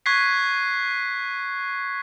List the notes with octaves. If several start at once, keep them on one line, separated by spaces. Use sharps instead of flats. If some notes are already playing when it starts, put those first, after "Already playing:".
C#6 F#6 G#6 B6 C7